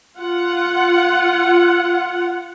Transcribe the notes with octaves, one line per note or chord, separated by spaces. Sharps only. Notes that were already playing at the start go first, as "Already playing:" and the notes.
F4 F#5